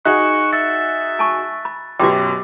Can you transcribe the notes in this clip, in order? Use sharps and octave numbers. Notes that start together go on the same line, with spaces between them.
D#4 F#4 G#4 C#6 F#6
E5 F#6 A6 C#7
G#5 A5 C#6
B5
F#2 B2 F#4 G4 G5 D6